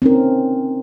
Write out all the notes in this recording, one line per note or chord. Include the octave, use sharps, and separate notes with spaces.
C4 C#4 D#4 A#4